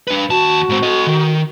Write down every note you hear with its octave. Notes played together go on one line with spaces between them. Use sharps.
D4 B4
D#2 F#4 A5
G#2 C4
A4 D#5
D#3